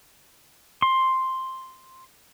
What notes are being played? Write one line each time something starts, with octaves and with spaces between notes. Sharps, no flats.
C6